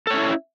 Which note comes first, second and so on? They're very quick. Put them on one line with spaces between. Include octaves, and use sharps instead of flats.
A4 C#5 C#4 E4